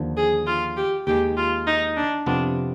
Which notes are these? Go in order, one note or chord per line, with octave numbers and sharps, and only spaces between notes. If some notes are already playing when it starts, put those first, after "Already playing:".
Already playing: D#2 D3 F3
G#4
F4
G4
D#2 D#3 G#3 G4
F4
D#4
D4
F2 C3 G3 B3 D4 F4